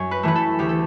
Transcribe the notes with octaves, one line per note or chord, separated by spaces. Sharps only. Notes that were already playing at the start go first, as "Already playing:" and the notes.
Already playing: F#2 C#5
B4
E3 A3 B4
A4
D2 G4
A4